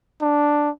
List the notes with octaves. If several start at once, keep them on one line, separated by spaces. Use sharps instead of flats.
D4